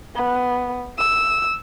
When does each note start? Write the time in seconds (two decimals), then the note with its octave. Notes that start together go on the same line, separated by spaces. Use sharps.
0.16 B3
0.98 E6